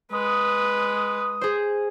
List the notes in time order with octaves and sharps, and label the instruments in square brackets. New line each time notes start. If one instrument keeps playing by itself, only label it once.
[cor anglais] G#3 [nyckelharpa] B4 [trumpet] D#6
[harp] G#4 C5